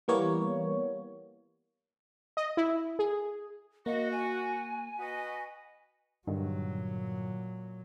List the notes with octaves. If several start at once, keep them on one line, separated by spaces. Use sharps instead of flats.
E3 G3 A#3 B3 C#5
D#5
E4
G#4
A#3 F#4 D#5
G#5
F#4 B4 D#5
G2 A#2 D3 D#3 F#3